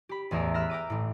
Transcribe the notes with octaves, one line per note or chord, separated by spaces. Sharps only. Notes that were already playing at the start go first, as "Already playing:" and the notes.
G4 B5
A1 E2 G#4 E5 A#5 D7
E5 B5 F6 F#6 A#6
G5 A#5 D6 D#7
A1 A2